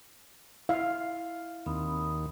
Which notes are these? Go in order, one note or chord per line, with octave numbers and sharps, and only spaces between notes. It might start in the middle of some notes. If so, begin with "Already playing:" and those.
E4 F5 F6
D#2 C4 B5 D#6